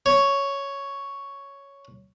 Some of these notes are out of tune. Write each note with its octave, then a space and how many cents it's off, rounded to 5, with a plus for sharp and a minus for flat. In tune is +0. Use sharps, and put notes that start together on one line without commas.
C#5 +5